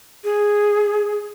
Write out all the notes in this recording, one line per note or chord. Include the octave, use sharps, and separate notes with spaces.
G#4